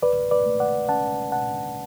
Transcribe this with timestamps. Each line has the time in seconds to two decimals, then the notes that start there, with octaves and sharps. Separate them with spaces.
0.02 C#2 B4 D5
0.31 B4 D5
0.46 A3
0.60 D5 F#5
0.88 C#4 F#5 A5
1.32 B2 F#5 A5